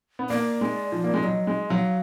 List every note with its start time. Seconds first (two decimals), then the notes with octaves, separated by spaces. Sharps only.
0.19 B3
0.30 A#3 D5
0.61 G#3
0.92 F3
1.04 A#3
1.14 G#3
1.24 F#3 D#5
1.47 G#3
1.70 F#3 F5